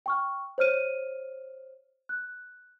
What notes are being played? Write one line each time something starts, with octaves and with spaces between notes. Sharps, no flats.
G5 C#6 F6
C5 C#5 F6 D#7
F#6